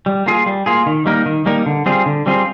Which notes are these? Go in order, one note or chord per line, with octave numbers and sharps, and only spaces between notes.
G3
A#3 F4 G#4
G3
A#3 F4 G#4
D#3
G3 A#3 D#4 A#4
D#3
G3 A#3 D#4 A#4
D3
G3 C4 F4 G#4
D3
G3 C4 F4 G#4